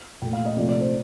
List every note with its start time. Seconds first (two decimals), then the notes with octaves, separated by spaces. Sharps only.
0.22 A#2 A3 G5
0.33 F5
0.45 D#5
0.56 C3 F3 A3 D5
0.69 D5
0.81 C5